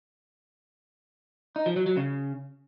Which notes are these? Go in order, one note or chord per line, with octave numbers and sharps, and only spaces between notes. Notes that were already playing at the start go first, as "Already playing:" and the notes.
D#4
F3
F#3
F#3
C#3